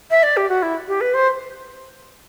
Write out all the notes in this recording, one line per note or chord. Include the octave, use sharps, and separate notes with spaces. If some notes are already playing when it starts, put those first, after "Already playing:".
E5
D5
G4
F#4
E4
G4
B4
C5